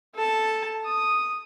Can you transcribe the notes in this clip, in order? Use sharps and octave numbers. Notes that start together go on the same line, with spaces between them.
A4 A5
D#6